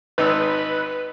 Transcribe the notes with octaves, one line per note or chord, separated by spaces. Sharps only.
G#1 D#4 B4 E6